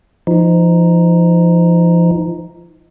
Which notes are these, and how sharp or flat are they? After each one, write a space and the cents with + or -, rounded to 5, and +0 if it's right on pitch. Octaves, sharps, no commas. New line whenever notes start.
F3 -30 D#4 +0